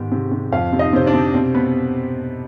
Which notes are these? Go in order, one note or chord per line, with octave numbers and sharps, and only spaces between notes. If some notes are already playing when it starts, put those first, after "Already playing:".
Already playing: G#2 D#3 B3 G4
C3
C3
F2 F4 F5
C3
D#4 D#5
C3 C5
D4 D5
C3
B2 C4 C5
B2 B3 B4